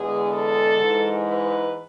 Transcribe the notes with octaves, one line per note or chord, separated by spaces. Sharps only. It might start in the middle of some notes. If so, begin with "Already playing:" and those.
Already playing: E2 D3 G#3 B3 G#4
A4
G#2 E3 G#3
B4